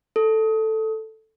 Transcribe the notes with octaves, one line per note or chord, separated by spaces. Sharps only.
A4